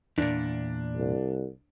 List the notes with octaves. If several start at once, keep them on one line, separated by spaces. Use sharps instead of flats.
E2 A#2 D4
C2